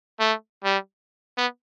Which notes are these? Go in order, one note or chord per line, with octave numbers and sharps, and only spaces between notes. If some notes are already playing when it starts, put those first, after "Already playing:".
A3
G3
B3